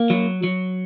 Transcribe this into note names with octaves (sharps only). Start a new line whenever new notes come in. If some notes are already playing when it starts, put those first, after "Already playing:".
Already playing: A#3
F#3
F#3